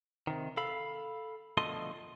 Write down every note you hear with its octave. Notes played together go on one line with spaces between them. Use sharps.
C3 D#3
A4 F5 B5
B2 D3 F3 A3 D#5 C6